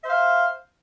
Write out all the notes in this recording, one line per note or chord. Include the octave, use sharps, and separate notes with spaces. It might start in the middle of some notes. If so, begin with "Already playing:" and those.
C5 E5 F5